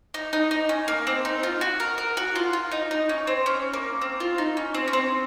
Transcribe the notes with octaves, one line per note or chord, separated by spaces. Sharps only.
D#4
D#4
D#4
C#4
A#3
C4
D#4
F4
F#4
A#4
A#4
F#4
F4
F4
D#4
D#4
C#4
C4
C#4
A#3
C4
F4
D#4
C#4
C4
C#4
C4